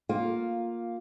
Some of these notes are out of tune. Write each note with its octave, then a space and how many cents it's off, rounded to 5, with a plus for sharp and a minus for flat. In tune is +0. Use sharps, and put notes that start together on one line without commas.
A#3 +0 F4 +10